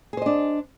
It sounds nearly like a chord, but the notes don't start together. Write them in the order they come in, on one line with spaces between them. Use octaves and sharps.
G#4 C5 D#5 D4